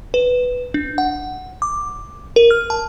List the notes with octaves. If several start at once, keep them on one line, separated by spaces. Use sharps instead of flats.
B4
D4
F#5
D6
A#4
F6
A5